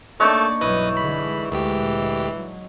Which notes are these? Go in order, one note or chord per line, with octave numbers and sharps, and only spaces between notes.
A3 A#3 D4 D#4 C#5 D5
B1 G2 E3 F#3 B4 D#5 D#6
D3 G#3 B5
D2 A#2 E3 G#3 G4
F#3